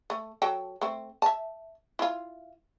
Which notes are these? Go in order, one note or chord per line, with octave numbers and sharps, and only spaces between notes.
A3
F#3 A4 G5
A3 C4
E5 A5
E4 F4